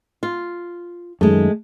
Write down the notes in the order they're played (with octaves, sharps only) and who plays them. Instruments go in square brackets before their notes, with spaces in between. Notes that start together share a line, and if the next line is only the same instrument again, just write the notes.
[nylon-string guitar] F4
[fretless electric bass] F#2 D#3 [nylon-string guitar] G#3 A3